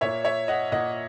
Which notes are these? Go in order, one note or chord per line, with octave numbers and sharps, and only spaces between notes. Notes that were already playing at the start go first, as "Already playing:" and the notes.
A#2 A#3 C#5 E5
C#5 E5
D#5 F#5
A#2 A#3 D#5 F#5